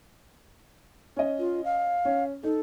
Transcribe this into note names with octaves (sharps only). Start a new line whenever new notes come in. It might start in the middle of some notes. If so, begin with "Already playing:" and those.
C#4 D#5
F4
F5
C#4
D#4 A4